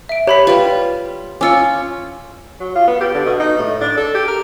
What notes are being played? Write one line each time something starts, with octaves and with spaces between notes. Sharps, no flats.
E5 D7
G4 C#5 B5 B6
G3 F4 B4
C#4 F4 D6 E6 C#7
F#3
F4
B3
G4
D3
B2
D#4
A2
D4
A4
G4
A#4